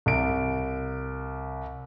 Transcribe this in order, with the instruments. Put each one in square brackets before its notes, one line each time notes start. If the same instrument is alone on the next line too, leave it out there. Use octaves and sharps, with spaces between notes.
[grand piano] C2 D7